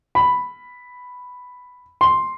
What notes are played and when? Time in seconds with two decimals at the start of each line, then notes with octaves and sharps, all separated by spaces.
0.15 B5
2.01 C6